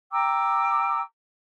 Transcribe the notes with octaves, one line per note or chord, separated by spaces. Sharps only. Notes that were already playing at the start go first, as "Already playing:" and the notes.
G5 A#5 D6 E6